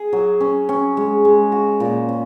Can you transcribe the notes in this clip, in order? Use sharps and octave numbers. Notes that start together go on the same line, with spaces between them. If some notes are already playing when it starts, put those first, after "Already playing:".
Already playing: G#4
F#3
C#4
C#4
G#3
G#3
F#4
A#2
C#4